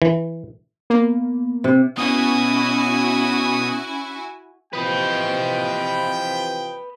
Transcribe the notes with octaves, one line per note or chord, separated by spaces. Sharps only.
E3
A#3 B3
C3 C4
B2 C#4 E4 F#4 G#5 D#6
C3 E3 F3 B4 D#5 G5